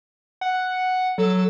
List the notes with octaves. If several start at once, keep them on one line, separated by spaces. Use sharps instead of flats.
F#5
F#3 A4